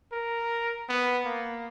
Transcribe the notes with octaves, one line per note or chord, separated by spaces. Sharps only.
A#4
B3
A#3